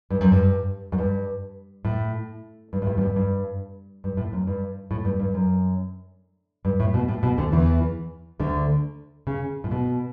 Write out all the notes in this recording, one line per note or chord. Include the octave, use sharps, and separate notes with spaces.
G2
F#2
G2
F#2
G2
A2
G2
A2
G2
F#2
G2
G2
G2
A2
F#2
G2
A2
G2
G2
F#2
G2
A2
B2
A2
B2
D2 D3
E2 E3
D2 D3
C#3
A2
B2